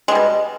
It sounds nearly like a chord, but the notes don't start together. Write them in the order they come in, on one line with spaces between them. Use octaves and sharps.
G#3 G3 B2